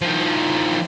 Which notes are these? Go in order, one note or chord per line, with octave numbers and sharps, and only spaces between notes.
D#3 F3